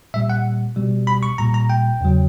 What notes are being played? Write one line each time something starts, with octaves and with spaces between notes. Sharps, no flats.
A#2 G3 E5
F#5
B2 G3
B5
C#6
A#2 G3 A#5
A#5
G5
E2 C#3 F#3